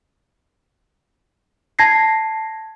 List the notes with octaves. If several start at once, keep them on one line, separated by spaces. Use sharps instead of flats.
A5 G#6 A#6 C7